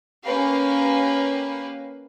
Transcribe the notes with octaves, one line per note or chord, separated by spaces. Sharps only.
A#3 C#4 G4 B4 F5